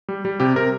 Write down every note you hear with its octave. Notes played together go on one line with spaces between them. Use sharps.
G3
G3
C3 G4
C3 A#4